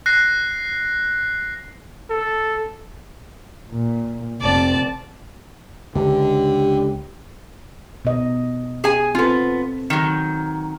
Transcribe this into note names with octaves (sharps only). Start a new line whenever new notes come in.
F#6 A#6 C7
A4
A#2
F1 C4 D5 A5
C#2 D3 G4
B2 D#5
G#4 G#5
B3 C4 F4 A4
D#3 F#3